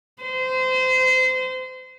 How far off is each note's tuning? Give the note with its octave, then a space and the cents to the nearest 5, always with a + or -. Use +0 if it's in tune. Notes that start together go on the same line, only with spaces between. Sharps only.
C5 -25